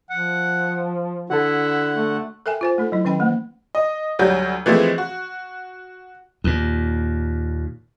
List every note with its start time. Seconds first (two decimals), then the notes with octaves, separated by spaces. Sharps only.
0.10 F3 F#5
1.30 D3 E4 F#4 A4 F#5
1.94 A3
2.46 A4 A#4 E5 G5 G#5
2.61 F4 C5 G#5
2.78 A3 D#4 A4
2.92 F#3 E4
3.05 D#3 F#3 C#4 D#5 G5 B5
3.19 E3 A3 A#3
3.75 D#5
4.19 D2 F#3 G3 G6
4.66 E3 F3 G#3 A3 C4
4.98 F#4
6.44 D#2 A#2